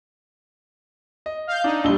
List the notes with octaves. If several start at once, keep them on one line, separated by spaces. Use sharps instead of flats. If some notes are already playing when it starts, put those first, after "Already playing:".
D#5
F5 G6
D4 D#4
A#1 G3 D4 E6 G7